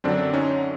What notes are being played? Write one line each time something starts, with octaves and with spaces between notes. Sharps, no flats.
F#2 D3 F#3 C4 D4
C#4 D#4